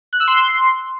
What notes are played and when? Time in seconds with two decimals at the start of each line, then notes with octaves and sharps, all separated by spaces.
0.13 F#6
0.20 E6
0.27 C6